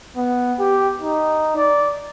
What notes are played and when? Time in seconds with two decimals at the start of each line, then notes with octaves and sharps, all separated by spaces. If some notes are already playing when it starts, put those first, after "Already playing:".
0.17 B3
0.60 G4
1.02 D#4
1.57 D5